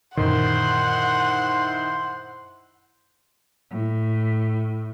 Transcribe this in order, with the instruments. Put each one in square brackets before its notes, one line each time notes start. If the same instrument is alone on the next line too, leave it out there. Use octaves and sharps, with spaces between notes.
[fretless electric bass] F#2 A#2 D3 [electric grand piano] D#3 [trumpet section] E4 C5 C6 [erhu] F#5
[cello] A2